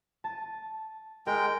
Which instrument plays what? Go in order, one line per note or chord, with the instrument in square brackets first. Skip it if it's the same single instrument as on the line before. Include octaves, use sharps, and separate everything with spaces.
[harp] A5 D#7
[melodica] G#3 G5 [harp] A#4